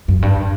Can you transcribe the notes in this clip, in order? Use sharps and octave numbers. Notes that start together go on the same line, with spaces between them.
F#2
G2